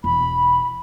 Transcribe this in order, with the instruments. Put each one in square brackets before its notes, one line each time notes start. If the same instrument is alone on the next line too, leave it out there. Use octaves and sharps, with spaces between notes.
[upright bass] E1 [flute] B5